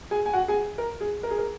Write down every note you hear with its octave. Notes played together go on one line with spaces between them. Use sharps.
G#4 G#5
G#5
F#4 F#5
G#4 G#5
A#4
G#4
A#4
G#4
A#4